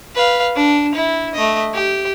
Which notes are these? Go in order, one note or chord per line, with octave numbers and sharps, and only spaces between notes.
B4 F5
D4
E4
A3 D#5
G4